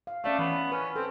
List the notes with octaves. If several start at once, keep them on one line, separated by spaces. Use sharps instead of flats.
F5
A3 C#4 D5 F5
E3 B3
C#4 B4
C4 A4